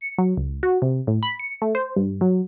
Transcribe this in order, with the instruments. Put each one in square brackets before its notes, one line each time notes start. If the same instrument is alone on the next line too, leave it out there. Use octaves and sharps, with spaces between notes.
[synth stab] C#7
F#3
C#2
F#4
C3
A2
B5
C#7
A3
C5
G2
F#3